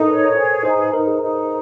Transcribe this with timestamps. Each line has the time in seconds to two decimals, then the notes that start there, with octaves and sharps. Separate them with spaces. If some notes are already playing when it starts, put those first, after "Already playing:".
Already playing: D#4 A4 A#4
0.08 B4 C#5
0.36 G#4 C5
0.65 D#4 C5
0.79 B4
0.93 D#4 A#4
1.07 G#4
1.21 D#4